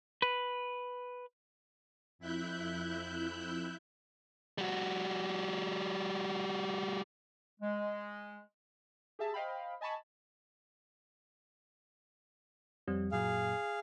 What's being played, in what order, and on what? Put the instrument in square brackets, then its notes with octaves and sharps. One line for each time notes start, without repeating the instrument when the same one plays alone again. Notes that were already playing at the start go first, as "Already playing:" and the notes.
[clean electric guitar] B4
[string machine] F2 E4 E5 F#6 G6
[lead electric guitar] G3 F#4
[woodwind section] G#3
[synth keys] G4 G#4 E5 A5
C5 D#5 F5 G5 B5
D#5 G#5 A5 B5 C#6
[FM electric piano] F2 G3 C4
[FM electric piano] F#2 A#2 F#3 [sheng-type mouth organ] G#4 F5